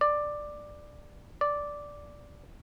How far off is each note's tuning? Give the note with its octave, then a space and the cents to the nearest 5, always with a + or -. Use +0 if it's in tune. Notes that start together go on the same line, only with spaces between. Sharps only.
D5 +10
D5 -5